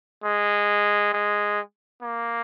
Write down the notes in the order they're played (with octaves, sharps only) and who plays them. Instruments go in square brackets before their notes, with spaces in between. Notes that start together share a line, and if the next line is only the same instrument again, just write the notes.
[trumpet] G#3
G#3
A#3